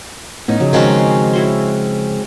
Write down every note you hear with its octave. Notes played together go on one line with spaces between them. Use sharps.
A2 A3 B3 C#4 D#4
C#3 F3 F#3
D#3 G#3 C4 C#4 F#4 A5
E4 F#4 C6